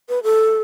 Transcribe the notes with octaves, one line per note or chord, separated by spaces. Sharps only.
B4
A4